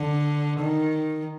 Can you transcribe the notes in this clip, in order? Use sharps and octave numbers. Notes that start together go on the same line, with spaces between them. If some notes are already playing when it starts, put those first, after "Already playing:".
Already playing: D3
D#3